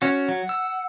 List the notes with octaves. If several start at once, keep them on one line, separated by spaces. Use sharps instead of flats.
C#4 F#4
F#3 F#5
E6